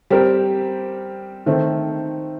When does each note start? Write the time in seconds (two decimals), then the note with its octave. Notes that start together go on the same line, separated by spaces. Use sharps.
0.10 G3 C4 G4 A#4
1.46 D#3 A3 C4